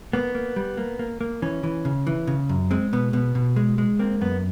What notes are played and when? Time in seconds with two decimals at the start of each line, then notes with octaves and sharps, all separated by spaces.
0.13 A#3 B3
0.35 A#3
0.56 G3
0.77 A#3
0.99 A#3
1.21 A#3
1.42 E3 C#4
1.63 E3
1.85 C#3
2.07 E3
2.27 C#3
2.49 F#2
2.71 G#3 C4
2.93 B2 B3
3.13 B2 B3
3.35 B2
3.56 G#3
3.78 G#3
3.99 A#3 C4
4.21 F#2 B3